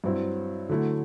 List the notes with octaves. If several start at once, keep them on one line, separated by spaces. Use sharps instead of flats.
G2 F#3 C4 E4
D3 F#3 A3 E4